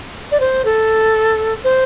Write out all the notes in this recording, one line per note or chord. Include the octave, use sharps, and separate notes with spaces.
D5
C5
A4
C5